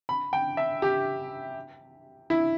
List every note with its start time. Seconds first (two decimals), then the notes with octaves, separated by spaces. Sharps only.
0.09 B5
0.33 G5
0.57 E5
0.82 G4
2.30 E4